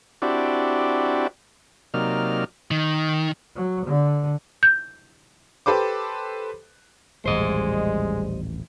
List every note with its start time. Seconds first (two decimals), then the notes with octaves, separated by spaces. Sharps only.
0.22 C4 D4 E4 F#4 G4 D5
1.94 C3 F#3 A#3 D#4 D5 F6
2.71 D#3
3.55 F#3
3.86 D3
4.63 G6
5.66 G4 A4 B4 C5 D6
7.26 D#1 A1 G3 G#3 C5 D#5